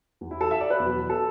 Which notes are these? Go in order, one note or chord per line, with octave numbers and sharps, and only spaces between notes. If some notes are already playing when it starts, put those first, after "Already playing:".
E2 E3
E4
A4
E5
D5
B4
E2 B2 F#3
A4